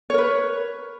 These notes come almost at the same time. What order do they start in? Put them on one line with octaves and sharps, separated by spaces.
C#5 A#4 B4